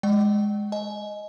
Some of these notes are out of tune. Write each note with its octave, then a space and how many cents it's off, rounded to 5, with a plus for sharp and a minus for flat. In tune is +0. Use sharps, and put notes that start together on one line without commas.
G#3 +0 D5 +35 G5 -45
D#5 +0 G#5 +25